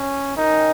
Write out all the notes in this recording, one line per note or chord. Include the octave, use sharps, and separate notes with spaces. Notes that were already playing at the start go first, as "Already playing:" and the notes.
Already playing: C#4
D#3 C#4 D#4 A#4